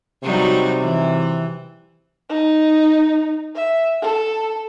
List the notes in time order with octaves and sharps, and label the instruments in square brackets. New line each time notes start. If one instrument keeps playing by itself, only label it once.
[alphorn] C3 [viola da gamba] F#3 G3 D#4
[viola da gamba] E3
[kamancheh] D#4
E5
A4